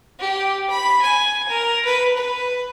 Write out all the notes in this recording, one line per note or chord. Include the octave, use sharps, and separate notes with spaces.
G4
B5
G#5
A#4
B4
B4